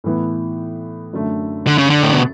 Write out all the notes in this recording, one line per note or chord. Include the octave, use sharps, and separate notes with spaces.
A2 E3 B3
F#2 D3 A3
D3
C#3
D3
A2
B2